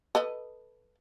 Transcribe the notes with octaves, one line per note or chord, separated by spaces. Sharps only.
A4 B4 D#5